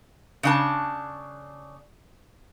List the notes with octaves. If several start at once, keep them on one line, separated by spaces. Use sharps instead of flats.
C#3 D4 A5